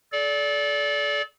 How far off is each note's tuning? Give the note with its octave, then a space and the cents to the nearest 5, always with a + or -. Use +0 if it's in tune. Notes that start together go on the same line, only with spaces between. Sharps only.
A4 -35 D5 -20